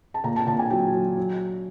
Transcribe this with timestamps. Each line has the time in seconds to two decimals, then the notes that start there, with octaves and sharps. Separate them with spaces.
0.14 A5
0.24 A#2 A#5
0.36 A5
0.47 A#2 A5
0.59 G#5
0.70 F#3 G5
0.94 F#3
1.17 F#3